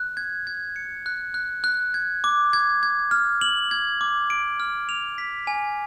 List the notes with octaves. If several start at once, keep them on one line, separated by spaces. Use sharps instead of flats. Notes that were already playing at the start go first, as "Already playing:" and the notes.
Already playing: F#6
G#6
G#6
C#7
F#6
F#6
F#6
G#6
D6
G#6
G#6
F6
F#7
G#6
D6
D7
F6
F7
B6
G#5